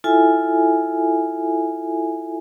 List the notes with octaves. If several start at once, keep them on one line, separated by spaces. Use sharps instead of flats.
E4 F4 A4 E5 G#5